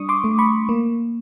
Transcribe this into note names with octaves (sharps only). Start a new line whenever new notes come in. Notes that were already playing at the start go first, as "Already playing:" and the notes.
Already playing: G3 D4 C#6 D#6
C6 D6
A3
B5 C#6
A#3